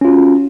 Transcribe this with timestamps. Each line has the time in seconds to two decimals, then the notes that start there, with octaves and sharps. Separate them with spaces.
0.01 C#4
0.05 F4
0.08 F#4